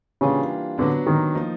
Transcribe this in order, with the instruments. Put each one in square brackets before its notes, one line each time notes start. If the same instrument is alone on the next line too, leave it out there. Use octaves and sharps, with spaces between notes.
[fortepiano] C#3 [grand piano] E3 G3 A#3 D4 F4
[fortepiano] D3 [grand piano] F#3 B3 D4
[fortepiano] D#3
[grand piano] F3 A#3 D#4